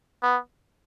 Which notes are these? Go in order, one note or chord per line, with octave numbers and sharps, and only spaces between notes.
B3